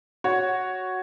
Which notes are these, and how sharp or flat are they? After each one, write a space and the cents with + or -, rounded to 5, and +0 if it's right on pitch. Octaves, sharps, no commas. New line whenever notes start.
F#4 +0 C#5 +0